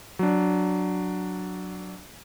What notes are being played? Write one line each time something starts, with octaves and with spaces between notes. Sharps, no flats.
F#3 D4